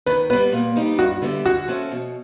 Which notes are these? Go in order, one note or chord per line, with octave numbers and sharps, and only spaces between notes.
D#3 B4
G3 B3 B4
A#2
G3 B3 D#4 G4
G2 F#4
D3 G3 B3 E4
D3 F#4
F3 A3 C#4
B2